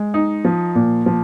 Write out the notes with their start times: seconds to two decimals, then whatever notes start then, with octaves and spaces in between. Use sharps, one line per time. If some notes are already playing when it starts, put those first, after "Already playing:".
Already playing: G#3
0.14 D#4
0.45 F3
0.75 A#2
1.06 F3